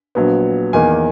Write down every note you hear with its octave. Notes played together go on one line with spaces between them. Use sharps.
A#1 A#2 F#3 B3
E2 D#3 A#3 G#5